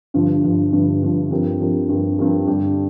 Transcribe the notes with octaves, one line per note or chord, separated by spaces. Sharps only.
G1 G2 F3
G1 G2 F3
G1 G2 F3
G1 G2 F3
G2 F3 C4 G4 A#4
G2 F3 C4 G4 A#4
G2 F3 C4 G4 A#4
G2 F3 C4 G4 A#4
G2 D3 G3 D4 G4